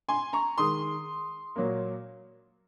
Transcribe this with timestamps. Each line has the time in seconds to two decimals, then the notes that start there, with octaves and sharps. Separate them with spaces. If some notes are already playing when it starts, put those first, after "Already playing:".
0.09 G#5 C6
0.33 A#5 C#6
0.58 D#3 G#3 C6 D#6
1.56 A#2 F#3 A#3